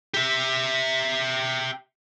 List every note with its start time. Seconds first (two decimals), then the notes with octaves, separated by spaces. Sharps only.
0.14 G4 E5